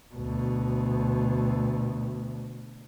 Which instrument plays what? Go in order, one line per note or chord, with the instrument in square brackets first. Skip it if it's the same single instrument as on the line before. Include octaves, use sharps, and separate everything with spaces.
[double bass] D2 B2